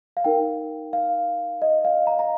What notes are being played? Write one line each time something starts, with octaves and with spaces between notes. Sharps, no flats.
F5
D#4 A#4 G5
F5
D#5
F5
A#5
A#5